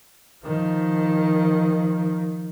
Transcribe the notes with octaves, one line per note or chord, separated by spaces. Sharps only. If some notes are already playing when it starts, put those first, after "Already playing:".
D#3 F3